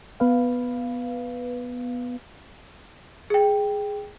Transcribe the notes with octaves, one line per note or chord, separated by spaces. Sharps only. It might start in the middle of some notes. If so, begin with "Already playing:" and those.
B3 B4 F5
G#4 G5